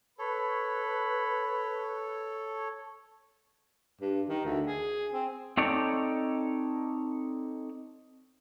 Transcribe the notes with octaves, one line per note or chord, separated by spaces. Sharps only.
A4 B4 C#5 B5
G2
D#3
D2
G#4
C4
C4 D#4 A4 C#5 D5